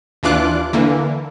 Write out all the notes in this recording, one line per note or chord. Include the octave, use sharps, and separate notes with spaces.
D#2 E3 D4 F4 D6 F#6
D3 E3 A#3